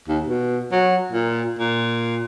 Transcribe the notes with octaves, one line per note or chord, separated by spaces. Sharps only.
D#2
B2
F#3
A#2
A#2